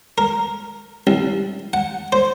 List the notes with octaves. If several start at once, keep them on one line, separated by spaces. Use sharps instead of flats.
A#4
C2
F#5
C5